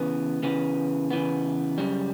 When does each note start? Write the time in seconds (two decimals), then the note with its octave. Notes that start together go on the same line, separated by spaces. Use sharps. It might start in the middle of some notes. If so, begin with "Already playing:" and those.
Already playing: C#3 E3 B3
0.43 C#3 E3 B3
1.11 C#3 E3 B3
1.78 F#2 C#3 G3